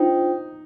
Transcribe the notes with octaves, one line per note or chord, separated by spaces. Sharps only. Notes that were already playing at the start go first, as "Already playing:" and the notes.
Already playing: D4 D#4 F4 C5 G5